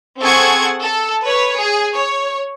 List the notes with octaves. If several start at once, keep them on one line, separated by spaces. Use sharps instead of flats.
C4 G#4 A4 F#5 C#6 G#6
A4
B4 C#5
G#4
C#5